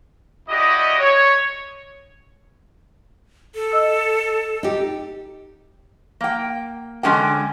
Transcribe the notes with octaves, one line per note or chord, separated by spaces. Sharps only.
A3 E4 F#4 G4 D5 D#5
C#5
A4
D#5 E6
D#4 G4
A#3 G5
D3 G#3 C#4 G#4 G5